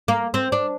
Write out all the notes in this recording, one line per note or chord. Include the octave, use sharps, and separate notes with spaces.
A#3
C4
D4